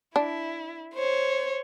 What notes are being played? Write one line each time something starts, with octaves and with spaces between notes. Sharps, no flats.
D4 E4
C5 C#5